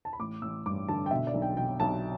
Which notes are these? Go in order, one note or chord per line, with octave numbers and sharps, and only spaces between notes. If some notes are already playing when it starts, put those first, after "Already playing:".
A5
B5
A1 D6
A1 E6
G2 D6
D3 A5
G5
B2 E5
D5
B1
G5
B2 G5
B1 A5